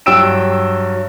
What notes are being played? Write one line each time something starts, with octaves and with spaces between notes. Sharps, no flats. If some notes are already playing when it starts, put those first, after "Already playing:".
G2 F#3 G5 E6 D7 E7